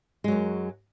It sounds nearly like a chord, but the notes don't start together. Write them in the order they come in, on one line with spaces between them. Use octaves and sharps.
G#3 F#3 F#2